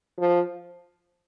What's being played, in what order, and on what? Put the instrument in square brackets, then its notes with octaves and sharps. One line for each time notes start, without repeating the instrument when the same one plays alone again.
[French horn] F3